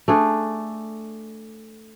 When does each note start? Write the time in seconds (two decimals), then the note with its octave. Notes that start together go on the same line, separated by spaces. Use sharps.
0.08 A3 D4 G#4